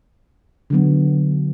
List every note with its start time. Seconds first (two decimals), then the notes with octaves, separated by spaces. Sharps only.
0.70 D3 F#3 B3